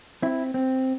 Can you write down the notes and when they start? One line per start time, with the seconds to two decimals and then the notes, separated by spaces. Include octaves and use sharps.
0.22 C4 E4
0.54 C4